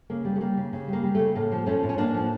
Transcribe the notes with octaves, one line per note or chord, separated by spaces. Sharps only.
C#3 A#3
G3
A3
G3 A#3
C#3
C#3
G3
A#3
G3
C#3 A3
A2 A#3
F3
F3 A3 C#4
A2
C#4
A2 A#3 D4
F3